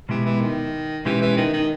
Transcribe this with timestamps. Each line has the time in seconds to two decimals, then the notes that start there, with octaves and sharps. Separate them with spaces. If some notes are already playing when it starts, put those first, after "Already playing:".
0.09 B2 E3 G#3 B3 G4
0.25 E3
0.41 D#3
1.05 B2 E3 G#3 C#4 G4
1.21 E3
1.37 D#3
1.53 D#3